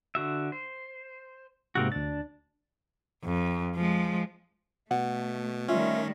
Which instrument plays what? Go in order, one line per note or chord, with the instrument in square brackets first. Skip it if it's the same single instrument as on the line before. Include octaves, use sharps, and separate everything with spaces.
[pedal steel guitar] D3 F#4 E5
C5
[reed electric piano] G#2 C3 F#6 [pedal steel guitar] A#3 C4 F#4
[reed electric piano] D2 A6 [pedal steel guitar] D4
[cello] F2
F3 G#3
[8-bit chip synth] B2 [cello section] A3 [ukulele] F#5
[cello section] D#3 G3 A3 [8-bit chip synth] C#4 [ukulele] F4 E5